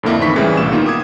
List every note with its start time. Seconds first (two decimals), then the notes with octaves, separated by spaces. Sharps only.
0.03 F2 A2 D3 A#3 E4
0.20 F2 D#3 E3 B5 C#6 B6
0.36 A2 C#3 E3 G3 G#3
0.57 C2 A#2 E7
0.72 D#3 A#3 B3 F4
0.86 D6 D#6 G#6